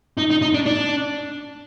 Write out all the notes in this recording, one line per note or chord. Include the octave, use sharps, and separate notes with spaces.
D#4
D#4
D#4
D4
D4